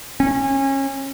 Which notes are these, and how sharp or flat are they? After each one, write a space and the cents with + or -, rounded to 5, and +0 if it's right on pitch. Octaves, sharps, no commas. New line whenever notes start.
C#4 -25